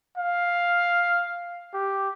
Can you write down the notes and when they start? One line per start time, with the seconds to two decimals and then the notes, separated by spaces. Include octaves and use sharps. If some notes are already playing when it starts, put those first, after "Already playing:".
0.18 F5
1.73 G4